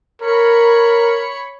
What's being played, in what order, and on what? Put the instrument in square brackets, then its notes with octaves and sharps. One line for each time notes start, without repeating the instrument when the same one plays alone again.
[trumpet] A#4 [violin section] C#5 B5 C#7